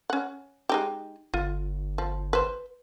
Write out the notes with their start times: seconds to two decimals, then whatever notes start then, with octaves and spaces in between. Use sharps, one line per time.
0.10 C#4 F#5
0.69 G#3 D#4 G4
1.34 G1 F4
1.98 F3
2.33 B4 C5